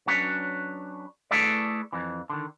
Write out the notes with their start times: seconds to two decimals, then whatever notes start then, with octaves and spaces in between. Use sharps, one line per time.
0.07 F#3 C#4 D4 B4 C#5
1.31 A3 E4 G#4 A4 B4 D5
1.92 F2 E3
2.30 D3 D#3